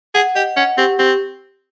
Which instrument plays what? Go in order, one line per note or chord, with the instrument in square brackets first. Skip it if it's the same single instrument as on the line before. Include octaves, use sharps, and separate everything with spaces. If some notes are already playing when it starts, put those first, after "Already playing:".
[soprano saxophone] G#4 [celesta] F#5
[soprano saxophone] G4 [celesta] D#5
[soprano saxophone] C#4 [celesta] F#5
[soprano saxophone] C4 [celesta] G4
[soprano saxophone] C4 [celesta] G4